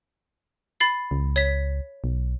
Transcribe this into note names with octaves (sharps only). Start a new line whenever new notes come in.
B5 A6 C7
C#2
C#5 B6
B1